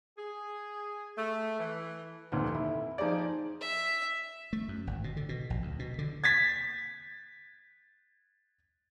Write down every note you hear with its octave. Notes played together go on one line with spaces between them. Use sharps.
G#4
A3
E3
F1 D2 A#2 D#3
E4
F3 D#4 G#4 D5
E5
A3
F#2
G#1
B2
D3
B2
A#1
D2
B2
D3
G#6 A6 B6